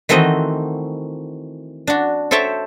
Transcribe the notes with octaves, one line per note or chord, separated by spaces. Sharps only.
D#3 E3 A3 C4 F#4 D#5
D4 F#4
A4 C5 C#5 E5 G5 A5